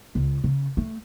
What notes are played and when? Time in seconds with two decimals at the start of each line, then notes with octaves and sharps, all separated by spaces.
0.15 C#2
0.44 C#3
0.77 A3